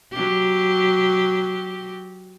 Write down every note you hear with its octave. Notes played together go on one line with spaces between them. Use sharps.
F#3 G4